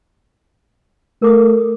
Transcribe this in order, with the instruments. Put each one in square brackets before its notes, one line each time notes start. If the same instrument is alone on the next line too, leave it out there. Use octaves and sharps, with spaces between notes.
[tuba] A3 [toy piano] A#4 D6 D#6